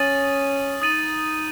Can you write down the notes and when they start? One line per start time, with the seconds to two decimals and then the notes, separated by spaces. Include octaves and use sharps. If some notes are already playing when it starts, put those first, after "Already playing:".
Already playing: C#4 D#6 A6 D#7 F#7
0.81 D#4 D#6 A6 D#7 F#7